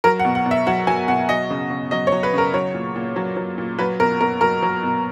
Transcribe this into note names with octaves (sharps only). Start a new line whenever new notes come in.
F#3 A#4
F#5
B2
F#5
B2
E5
F#3 F#5
F#3 G#5
B2 F#5
F#3 D#5
C#3
C#3
F#3 D#5
C#5
F#3
B4
C#3 A#4
F#3 C#5
A#2
A#2
F#3
F#3
A#2
F#3 B4
B2 A#4
B2 A#4
F#3 A#4
F#3
B2